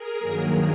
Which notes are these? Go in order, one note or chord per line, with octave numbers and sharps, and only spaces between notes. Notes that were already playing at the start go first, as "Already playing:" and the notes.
Already playing: G#4 A#4
G2 D#3 F#3 A#3